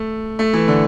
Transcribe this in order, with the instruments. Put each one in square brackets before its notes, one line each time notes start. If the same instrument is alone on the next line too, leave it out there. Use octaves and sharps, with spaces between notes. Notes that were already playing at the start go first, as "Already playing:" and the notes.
Already playing: [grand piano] A3
A3
E3
D3